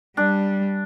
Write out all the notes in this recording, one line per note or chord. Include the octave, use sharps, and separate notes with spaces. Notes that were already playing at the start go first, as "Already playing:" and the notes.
G3 D4